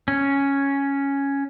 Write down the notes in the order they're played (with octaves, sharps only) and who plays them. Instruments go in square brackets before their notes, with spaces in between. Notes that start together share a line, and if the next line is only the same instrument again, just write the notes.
[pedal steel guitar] C#4